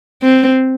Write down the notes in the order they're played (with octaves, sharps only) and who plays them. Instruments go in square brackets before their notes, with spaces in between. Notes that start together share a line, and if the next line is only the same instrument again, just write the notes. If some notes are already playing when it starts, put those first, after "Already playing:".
[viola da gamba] C4